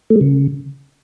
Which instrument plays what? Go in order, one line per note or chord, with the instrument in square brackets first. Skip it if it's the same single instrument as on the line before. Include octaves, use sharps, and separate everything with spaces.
[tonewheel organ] A3
G#3
C#3